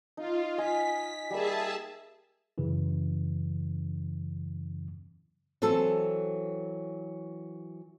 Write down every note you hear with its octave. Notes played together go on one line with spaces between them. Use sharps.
D#4 F4
D#5 G#5 B6
G3 A#3 G#4 E5 A5
F#2 C#3 E3
E3 F#3 C4 A4